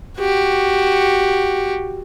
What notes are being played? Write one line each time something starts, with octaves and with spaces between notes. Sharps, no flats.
F#4 G4